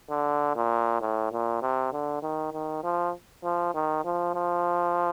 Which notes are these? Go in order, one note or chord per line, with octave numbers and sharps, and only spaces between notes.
D3
A#2
A2
A#2
C3
D3
D#3
D#3
F3
F3
D#3
F3
F3